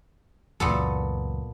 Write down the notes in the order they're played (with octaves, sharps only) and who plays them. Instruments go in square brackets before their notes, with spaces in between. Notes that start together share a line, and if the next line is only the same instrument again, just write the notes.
[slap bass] C#2 F#2 E3 [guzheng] A#2 B3 A4